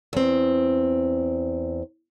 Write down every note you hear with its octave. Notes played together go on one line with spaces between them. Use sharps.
E2 C4